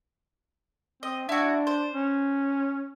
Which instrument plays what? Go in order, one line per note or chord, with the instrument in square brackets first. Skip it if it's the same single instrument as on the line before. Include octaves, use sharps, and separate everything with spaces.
[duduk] C4 [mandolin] D#5
[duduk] D4 [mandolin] E4 F#4
[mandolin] C5
[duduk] C#4